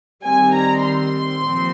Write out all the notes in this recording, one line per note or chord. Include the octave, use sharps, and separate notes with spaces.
D#3 G3 C4 G#5
A#5
C6
A#2 F3 C4